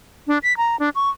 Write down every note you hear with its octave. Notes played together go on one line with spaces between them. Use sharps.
D4
B6
A#5
D4
C#6